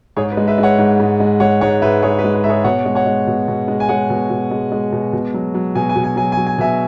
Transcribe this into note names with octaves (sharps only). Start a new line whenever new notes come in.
G#2 G#4 C#5
B4
G#3
B4 E5
G#3
C#5 F#5
G#2
G#2
G#3
G#3 C#5 F#5
G#2 C#5 F#5
G#2 B4 E5
G#3 G#4 C#5
B4
G#3
B4
G#2 E5
G#4 C#5
B2 C#5 F#5
G#3
C#5 F#5
G#3
B2
B2
G#3
G#5
G#3 C#5 F#5
B2
B2
G#3
G#3
B2
B2
F#3
F#3
B2 G#5
G#5
B2
G#5
F#3 G#5
G#5
F#3
G#5
B2 E5 G#5